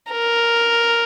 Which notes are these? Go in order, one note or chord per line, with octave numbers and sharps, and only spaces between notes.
A#4